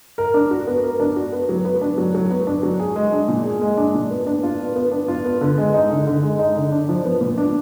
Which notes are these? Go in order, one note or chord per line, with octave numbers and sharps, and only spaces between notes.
A#4
D4
F#4
B3
A#4
D4
F#4
B3
F#3
B3
D4
F#3
F#3
B3
D4
F#3
G#4
G#3
D4
A#2
G#4
G#3
D4
A#2
B3
D4
F4
B3
B3
D4
F4
B3
D3
G#3
D#4
D3
D3
G#3
D#4
D3
D4
F3
B3
A#2
D4